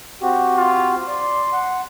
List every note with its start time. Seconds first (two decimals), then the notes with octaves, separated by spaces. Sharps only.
0.22 C4 F#4 G4
0.56 F4
1.08 D5 C6
1.53 F#5